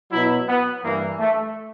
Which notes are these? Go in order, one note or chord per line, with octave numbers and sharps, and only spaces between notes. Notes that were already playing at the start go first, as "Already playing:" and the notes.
B2 F#3 E4
B3
G2 E3 A#3
A3